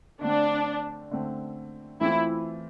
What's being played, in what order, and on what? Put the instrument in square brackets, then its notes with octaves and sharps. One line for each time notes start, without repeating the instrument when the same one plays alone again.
[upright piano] D3 A3 C4 [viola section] D4
[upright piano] D3 A3 C4
[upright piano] E3 A3 C4 F4 [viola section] E4